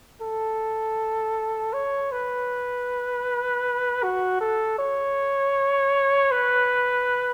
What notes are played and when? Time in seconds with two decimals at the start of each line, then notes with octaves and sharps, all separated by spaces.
0.21 A4
1.73 C#5
2.12 B4
4.03 F#4
4.41 A4
4.79 C#5
6.32 B4